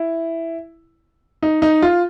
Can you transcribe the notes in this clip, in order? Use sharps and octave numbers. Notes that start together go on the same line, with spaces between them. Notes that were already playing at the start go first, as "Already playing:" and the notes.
Already playing: E4
D#4
D#4
F4